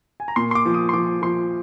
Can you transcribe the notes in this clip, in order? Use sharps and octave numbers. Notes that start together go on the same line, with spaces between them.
G#5
A#5
A#2 C6
C6
D6
F3
D#6
C6
F3 D6
F3 C6